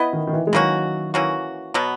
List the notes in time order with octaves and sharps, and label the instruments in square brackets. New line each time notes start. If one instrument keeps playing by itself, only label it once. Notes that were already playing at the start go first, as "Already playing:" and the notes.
Already playing: [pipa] B3 E4 B4 D#5
[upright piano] D#3
D#3
E3
G#3
[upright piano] D#3 F#3 [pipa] E3 A#3 C#4 F#4
[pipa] E3 A#3 C#4 F#4
B2 F#3 B3